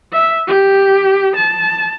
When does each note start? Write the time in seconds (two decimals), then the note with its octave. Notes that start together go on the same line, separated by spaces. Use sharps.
0.13 E5
0.47 G4
1.36 A5